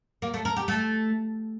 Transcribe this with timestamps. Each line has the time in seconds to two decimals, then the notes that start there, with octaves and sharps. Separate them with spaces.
0.22 A#3
0.34 A3
0.45 A#4
0.57 G4
0.68 A3